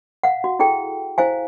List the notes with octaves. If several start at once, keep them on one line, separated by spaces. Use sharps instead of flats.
F5 F#5
F#4
E4 G#4 A4 G5
E4 C5 F5 G#5